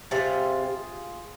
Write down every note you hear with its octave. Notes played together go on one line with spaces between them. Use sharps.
C3 G3 F4 G#4